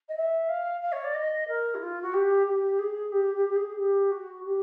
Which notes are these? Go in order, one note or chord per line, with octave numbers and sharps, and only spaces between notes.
D#5
E5
F5
F5
C#5
D5
D#5
A#4
E4
F4
F#4
G4
G4
G#4
G4
G4
G4
G#4
G#4
G4
F#4
G4